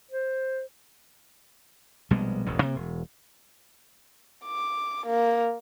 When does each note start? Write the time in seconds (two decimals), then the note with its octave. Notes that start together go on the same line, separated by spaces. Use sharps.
0.11 C5
2.11 A#1 B2 G3 G#3
2.46 E1 A1 E2
2.62 C3 A#3
2.76 E1
4.45 D6
5.06 A#3